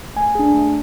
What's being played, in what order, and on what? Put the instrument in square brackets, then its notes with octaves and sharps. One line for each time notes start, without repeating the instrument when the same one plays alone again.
[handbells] A3 G#5
D4 G#4
A3